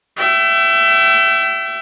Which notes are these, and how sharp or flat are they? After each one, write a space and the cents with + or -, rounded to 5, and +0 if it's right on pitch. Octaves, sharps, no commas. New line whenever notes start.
E5 +20 G5 -30